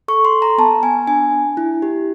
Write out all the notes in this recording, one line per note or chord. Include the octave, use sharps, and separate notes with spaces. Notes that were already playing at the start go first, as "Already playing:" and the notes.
A4 C#6
C6
A4
A#5
B3 A5
B3 G#5
D4 G#5
D4
E4
G4